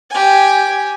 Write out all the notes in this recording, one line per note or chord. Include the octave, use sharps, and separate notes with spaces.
G4 G#5